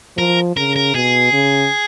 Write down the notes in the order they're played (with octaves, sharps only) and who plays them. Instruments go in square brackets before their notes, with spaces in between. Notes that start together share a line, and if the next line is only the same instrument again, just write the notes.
[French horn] F3 [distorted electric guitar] A#4
[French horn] C#3 [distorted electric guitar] A#4
[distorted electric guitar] A#4
[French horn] B2 [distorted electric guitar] G#4
[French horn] C#3